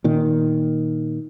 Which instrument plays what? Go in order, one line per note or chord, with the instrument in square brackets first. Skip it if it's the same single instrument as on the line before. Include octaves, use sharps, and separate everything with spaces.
[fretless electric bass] A#2 D#3